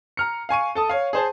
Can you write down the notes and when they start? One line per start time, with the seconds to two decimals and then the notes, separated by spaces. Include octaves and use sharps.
0.17 A#5 F6 C#7
0.49 F5 G#5 C#6 D#7
0.75 A4 A5 D#6
0.89 C#5 F5
1.13 G#4 C5 A5